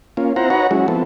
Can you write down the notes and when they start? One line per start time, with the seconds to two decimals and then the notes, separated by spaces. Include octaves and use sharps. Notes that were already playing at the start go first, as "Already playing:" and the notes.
0.17 A#3 C#4 F4
0.36 C4 E4 F4 C5 F#5 A#5
0.50 D#4 F#4 B4 C#5 F#5 A#5
0.71 F#3 G#3 C#4 E4 F#4
0.88 F3 B3 C4 E4 A4